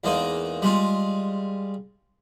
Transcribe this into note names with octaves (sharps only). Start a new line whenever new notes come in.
E2 G#3 A#3 D#4
G3 G#3 F4